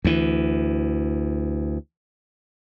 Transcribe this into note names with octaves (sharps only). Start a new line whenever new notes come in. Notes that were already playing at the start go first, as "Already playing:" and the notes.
D2 E3